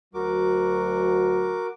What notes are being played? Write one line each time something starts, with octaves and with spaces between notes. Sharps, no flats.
D2 F#3 F#4 A#4 D6